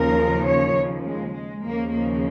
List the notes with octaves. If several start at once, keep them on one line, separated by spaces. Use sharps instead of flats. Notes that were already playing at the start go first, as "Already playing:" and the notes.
Already playing: D#2 C#3 F3 A#4
C#5
G#3
G#3
D#2 C#3 F3 A#3
A#3